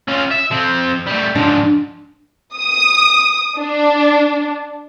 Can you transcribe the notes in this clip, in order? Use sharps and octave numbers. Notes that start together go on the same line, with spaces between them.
C#4 F4
E5
F3 C4
G3 A3
G#2 F3 D4
D#6
D4